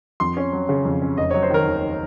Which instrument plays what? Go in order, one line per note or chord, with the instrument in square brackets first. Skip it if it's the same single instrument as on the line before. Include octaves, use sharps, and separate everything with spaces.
[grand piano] F2 C6
C#4
F#3
C#3
F2
C#4
F1 D#5
F#3 C#5
C5
D#3 A#4
D#2